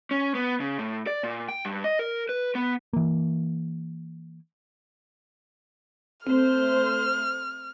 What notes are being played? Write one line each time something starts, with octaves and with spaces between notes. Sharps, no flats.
C#4
B3
C#3
A2
D5
A#2
G5
G2
D#5
A#4
B4
B3
E3 A#3
A3 C4 C5 F6